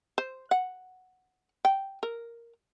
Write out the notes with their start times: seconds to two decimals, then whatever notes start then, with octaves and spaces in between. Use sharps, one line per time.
0.18 C5
0.51 F#5
1.65 G5
2.03 A#4